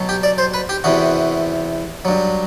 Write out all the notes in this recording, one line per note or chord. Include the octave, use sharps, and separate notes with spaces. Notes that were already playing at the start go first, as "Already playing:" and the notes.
Already playing: B2 F#3
G4
D5
C5
B4
G4
E2 C3 E3 F#4
G2 F#3